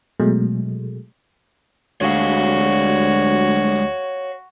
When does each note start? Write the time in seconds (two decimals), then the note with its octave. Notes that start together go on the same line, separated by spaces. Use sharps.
0.20 B2 F#3 G#3 A3
2.01 D2 G3 G#3 F#4 C#5 F5